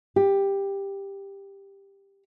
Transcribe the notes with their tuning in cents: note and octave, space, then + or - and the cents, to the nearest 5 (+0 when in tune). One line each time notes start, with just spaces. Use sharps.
G4 +10